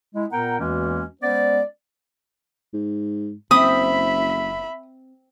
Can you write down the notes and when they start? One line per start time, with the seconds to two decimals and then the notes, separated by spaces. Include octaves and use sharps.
0.15 G#3 E4
0.32 A#2 B3 A#4 F#5 G5 A#5
0.60 E2 E3 G#3 A#3 C#4 F#4
1.21 G#3 B3 C#4 C5 D5
2.74 G#2
3.51 F#1 C4 E5 B5 D#6